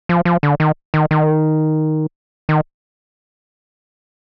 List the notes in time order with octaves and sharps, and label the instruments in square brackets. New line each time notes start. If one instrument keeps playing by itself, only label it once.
[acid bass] F3
F3
D3
D#3
D#3
D#3
D#3